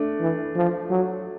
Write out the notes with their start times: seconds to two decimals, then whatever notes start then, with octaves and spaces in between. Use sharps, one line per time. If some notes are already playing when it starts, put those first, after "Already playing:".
Already playing: A3 D4
0.20 E3
0.56 F3
0.90 F#3